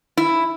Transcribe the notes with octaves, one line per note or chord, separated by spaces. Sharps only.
E4